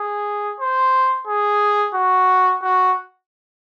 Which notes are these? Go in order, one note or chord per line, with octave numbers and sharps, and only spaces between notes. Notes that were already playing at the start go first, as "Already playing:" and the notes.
Already playing: G#4
C5
G#4
F#4
F#4